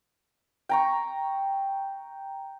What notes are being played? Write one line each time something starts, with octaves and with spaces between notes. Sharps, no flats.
G5 A#5 C#6